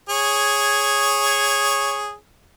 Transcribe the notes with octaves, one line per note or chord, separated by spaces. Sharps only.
G#4 C#5